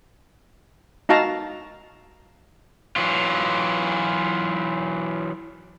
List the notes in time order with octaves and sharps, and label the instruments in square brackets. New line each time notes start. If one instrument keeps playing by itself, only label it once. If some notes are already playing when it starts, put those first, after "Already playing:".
[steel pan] D#4 F#4 F5 A5 A#5
[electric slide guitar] E3 F#3 F4